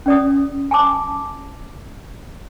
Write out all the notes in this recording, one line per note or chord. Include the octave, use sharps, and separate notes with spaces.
C#4 D5 D#6
G#5 A5 D6